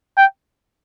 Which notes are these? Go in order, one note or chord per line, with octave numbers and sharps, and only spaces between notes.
G5